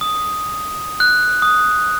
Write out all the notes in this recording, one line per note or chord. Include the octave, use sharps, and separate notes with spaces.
D#6
F#6
D#6